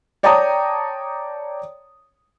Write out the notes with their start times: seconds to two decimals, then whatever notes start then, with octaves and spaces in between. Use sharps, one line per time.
0.23 C#5 D5 G5 A5 A#5 D#6